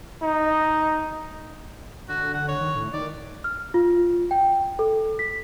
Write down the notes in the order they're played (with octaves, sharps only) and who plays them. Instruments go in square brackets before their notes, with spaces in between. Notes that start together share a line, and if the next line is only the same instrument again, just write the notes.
[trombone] D#4
[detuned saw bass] D3 [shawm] F#4
[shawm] F#5
C#5
[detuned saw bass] D#3
A2
[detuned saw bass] D#3 [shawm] D5
[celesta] F6
F4
G5
A4
B6